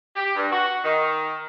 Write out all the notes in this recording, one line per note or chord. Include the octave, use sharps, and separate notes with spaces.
G4
G2
F#4
D#3